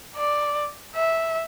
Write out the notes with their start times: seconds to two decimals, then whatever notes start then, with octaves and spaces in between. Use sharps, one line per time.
0.16 D5
0.96 E5